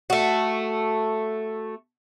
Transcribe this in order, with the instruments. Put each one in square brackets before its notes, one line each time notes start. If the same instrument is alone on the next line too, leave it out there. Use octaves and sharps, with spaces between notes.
[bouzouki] A3 F#4